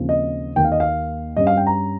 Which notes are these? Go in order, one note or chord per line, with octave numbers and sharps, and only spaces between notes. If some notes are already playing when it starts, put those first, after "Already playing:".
Already playing: D#2 C#3 F3 C4
D#5
D#2 D#3 A#3 G5
F5
D#5
F5
G2 G3 C#4 D#5
F5
G5
A#5